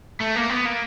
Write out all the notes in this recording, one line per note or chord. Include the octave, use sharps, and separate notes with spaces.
A3
A#3
B3
A#3